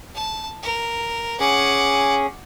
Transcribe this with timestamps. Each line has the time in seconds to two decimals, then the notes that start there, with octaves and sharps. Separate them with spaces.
0.15 A5
0.63 A#4
1.40 C#4 G#4 F#5 D6